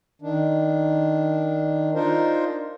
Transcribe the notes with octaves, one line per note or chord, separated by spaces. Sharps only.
D#3 D4
D4 D#4 F4 A#4 C5